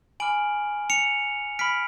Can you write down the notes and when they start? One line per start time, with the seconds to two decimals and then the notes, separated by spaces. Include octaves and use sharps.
0.20 G#5 B5 D6 F6 D7 F#7
0.90 C#7 F7
1.59 B5 F6 B6 D7